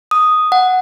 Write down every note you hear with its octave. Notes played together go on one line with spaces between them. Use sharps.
D#6
F#5